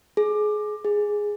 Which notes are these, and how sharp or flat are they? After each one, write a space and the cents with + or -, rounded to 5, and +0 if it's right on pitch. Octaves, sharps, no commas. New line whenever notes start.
G#4 +25
G#4 -5